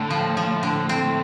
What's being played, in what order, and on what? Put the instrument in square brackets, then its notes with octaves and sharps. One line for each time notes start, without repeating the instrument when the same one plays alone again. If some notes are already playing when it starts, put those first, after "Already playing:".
Already playing: [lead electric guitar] A2 [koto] D3
[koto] F3
F3
D3
C4